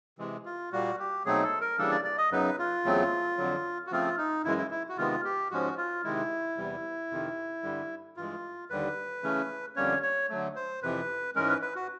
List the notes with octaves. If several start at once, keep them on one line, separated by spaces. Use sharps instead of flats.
C3 E3 G#3
F4
A#2 G3 A#3 F#4
G4
B2 F#3 A3 C4 D#4 G#4
A4
A#4
C#3 E3 G3 A#3 D4 A4
D5
D5
D#5
F#2 C#3 F#3 B3 D#4 B4
F4
E2 C#3 F#3 A3 C4
F2 D3 F#3
F#4
C#3 F3 A3 C4 F4
D#4
F#2 C#3 E3 G#3 E4
E4
E4
F#4
C3 D#3 G#3 B3 F4
G4
G#2 F3 G#3 C#4 F#4
F4
C3 D#3 G#3 E4
E2 C3 E3 G3
F2 C3 D#3
G2 D3 G3
G2 E3 G#3 F4
D#2 D3 G3 B4
C#3 E3 A3 C#4
F2 D3 G3 A#3 C#4 C#5
C#5
D3 F#3 A3
C5
F2 C3 E3 B4
G#2 E3 G#3 C#4 A#4
B4
B4
F#4